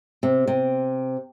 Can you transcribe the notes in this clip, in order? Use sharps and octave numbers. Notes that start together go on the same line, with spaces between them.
C3
C3